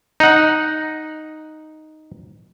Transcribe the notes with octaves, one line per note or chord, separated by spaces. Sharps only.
D#4 F#5